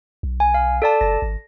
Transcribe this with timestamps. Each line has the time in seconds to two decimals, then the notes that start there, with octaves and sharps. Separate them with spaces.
0.23 B1
0.40 G#5
0.54 F5
0.82 A4 D5 A5
1.01 F#1 A#6
1.22 G#1